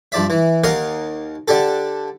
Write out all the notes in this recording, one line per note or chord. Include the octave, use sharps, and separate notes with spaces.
G2 F3 D5 E5
E3
D#2 A#4 D#5 F5 F#5 D#6
D3 D4 G4 A4